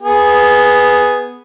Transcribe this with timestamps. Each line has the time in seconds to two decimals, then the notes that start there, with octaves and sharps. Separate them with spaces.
0.01 B3 G#4